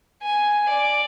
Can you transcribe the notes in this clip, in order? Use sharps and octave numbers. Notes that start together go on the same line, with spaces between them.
G#5
D5